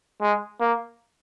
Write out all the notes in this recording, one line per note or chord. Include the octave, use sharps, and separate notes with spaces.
G#3
A#3